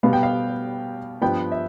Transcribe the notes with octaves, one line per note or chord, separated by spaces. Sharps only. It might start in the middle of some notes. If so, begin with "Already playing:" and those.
B2 G3 B3 F5
G5
F5
G2 F3 B3 G5
E5